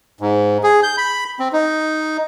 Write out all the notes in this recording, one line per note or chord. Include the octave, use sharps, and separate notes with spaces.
G#2
G#4
G6
B5
C4
D#4